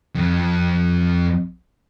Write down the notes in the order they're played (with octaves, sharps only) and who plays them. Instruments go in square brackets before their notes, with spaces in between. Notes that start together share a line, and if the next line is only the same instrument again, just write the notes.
[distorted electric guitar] F2